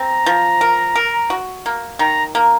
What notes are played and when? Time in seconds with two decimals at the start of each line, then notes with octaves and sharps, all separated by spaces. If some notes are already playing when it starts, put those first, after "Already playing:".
Already playing: C4 A#5
0.26 F3
0.61 A#4
0.96 A#4
1.30 F#4
1.66 A#3
1.99 D#3 A#5
2.35 A#3